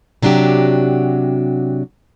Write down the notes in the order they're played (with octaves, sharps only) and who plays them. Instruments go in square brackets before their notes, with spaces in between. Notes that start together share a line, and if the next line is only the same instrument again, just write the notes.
[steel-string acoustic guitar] C3 F#3 D4 F#4 G4